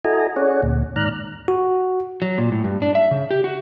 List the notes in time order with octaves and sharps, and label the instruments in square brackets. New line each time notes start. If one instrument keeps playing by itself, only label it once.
[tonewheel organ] E4 F#4 A4 D#5 G#5 A#5
C#4 G#4 C#5 D5 F#5
D2 A#2
G#2 D#3 D5 A#5 F6 F#6
[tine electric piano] F#4
[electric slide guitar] F#3
A#2
A2
G2
D4
E5
C#3
G4
F#4